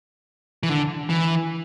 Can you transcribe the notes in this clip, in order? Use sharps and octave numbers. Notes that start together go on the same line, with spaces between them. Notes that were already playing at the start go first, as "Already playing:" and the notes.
E3
D3
E3